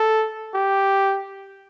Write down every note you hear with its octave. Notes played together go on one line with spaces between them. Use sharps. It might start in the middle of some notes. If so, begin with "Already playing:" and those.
Already playing: A4
G4